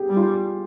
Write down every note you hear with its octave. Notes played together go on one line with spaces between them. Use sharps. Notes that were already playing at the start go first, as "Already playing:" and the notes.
Already playing: G4 G#4
G3
F4